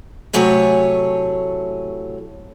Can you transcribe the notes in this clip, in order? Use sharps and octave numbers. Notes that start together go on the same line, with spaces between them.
A2 C3 F#3 A3 C#5 G#5